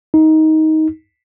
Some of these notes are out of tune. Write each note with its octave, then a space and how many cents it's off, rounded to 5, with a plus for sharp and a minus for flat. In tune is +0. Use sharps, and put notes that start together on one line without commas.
D#4 +15